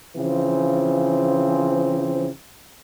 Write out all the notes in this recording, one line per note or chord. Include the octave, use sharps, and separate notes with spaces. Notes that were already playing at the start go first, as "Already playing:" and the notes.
C#3 E3 F3 C4